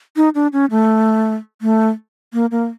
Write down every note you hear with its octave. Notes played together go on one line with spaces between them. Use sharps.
D#4
D4
C#4
A3
A3
A#3
A#3